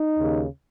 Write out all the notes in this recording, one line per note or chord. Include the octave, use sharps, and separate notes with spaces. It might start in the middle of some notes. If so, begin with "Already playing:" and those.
Already playing: D#4
D#2 C#3